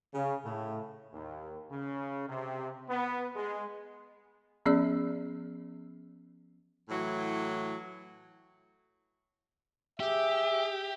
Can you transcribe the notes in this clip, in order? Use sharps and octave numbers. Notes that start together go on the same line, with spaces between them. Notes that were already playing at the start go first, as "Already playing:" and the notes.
C#3
A2
D#2
C#3
C3
B3
G#3
F3 B3 C#4 G#4 D5 E6
A2 E3 F#3
G4 G#4 E5